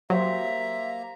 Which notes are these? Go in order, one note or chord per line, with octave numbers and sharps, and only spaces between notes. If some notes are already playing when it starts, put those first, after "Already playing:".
F#3 A#3 G4 C5 E5 A#5